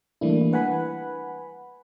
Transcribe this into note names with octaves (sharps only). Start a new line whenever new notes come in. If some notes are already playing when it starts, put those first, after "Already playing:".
E3 G3 A3 A#3 D4 E4
B4 F#5 G#5 B5